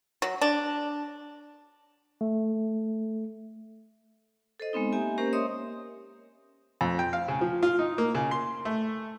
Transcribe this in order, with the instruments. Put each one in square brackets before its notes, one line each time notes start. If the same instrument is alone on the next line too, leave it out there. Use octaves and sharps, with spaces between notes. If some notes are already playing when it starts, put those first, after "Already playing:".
[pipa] F#3
D4
[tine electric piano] A3
[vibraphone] A4 C5 D#5
G#3 B3 C4 D#4
A#3 G4 E5 G#5
A#3 C#4 G4 A#4 C5
C#5 D#5 E5 C6 D#6
[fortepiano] F2
G5
F5
C#3
F3
F4
D#4
A#3
C#3
C6
A3